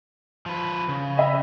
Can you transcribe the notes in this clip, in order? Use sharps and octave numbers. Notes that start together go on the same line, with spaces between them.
F3 B4
C#3
D#5 E5 B5